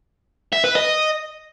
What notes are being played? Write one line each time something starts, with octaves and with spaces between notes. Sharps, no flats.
E5
B4
D#5